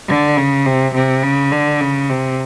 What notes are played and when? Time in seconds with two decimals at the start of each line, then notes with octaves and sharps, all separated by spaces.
0.09 D3
0.37 C#3
0.66 C3
0.95 C3
1.23 C#3
1.52 D3
1.81 C#3
2.10 C3